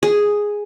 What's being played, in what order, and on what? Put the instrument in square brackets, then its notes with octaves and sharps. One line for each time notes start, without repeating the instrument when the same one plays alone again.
[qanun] G#4